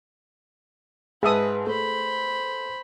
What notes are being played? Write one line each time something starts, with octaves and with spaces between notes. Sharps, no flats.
G#2 G#4 B4 E5 A5 D#6
A3 C5 B5